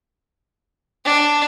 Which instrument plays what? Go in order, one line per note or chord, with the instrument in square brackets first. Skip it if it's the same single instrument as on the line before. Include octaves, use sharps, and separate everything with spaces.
[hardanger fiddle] D4